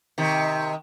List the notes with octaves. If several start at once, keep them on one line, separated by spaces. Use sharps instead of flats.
C3 D#3